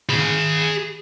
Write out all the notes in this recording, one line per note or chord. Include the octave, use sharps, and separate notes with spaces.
G#4 B5